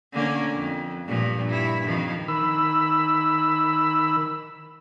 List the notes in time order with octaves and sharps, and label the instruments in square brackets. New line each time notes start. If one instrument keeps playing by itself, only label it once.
[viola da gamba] D3 A#3 C#4
F2
G2 A#2 F3
G2 E4
F2 D#3 F3
[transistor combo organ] D#3 B5 E6